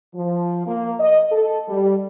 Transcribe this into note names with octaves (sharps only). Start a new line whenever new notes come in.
F3
A#3
D#5
A4
G3